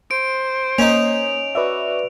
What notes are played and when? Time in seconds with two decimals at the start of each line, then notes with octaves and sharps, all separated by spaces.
0.11 C5 D7
0.78 A#3 C#4 D#4 F7
1.55 F#4 B4 D5 E5